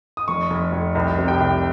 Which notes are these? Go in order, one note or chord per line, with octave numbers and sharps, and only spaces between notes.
D#6
F1 C#6
F1
F1
C2 A#5
C3
G5
C2